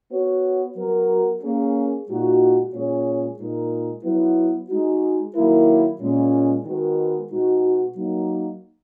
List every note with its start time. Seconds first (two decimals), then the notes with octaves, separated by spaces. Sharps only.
0.11 B3 F#4 C#5
0.77 F#3 B3 F#4 A#4
1.42 A#3 C#4 G#4
2.08 A#2 G#3 D#4 F#4
2.72 A#2 G#3 C#4 G#4 C#5
3.38 A#2 G#3 D#4 A#4
4.04 F#3 B3 E4
4.69 G#3 D#4 F#4
5.35 D#3 F#3 A#3 E4 A#4
6.00 A#2 G#3 C#4
6.65 D#3 G#3 B3 F#4 A#4
7.31 B2 G#3 D#4 F#4
7.96 F#3 A#3 D#4